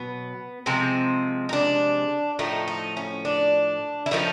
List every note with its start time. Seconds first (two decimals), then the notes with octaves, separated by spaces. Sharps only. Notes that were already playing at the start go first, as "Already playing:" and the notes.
Already playing: B2 F#3 B3
0.66 C3 F3 G#3 C4
1.49 D#4
1.53 D4
2.39 A2 F3 A3 D#4
2.68 D#4
2.97 C#4
3.25 D4
4.06 E4
4.11 A2 F3 A3 D#4